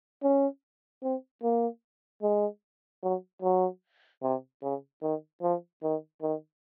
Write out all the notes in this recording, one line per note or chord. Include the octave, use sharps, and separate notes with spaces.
C#4
C4
A#3
G#3
F#3
F#3
C3
C#3
D#3
F3
D#3
D#3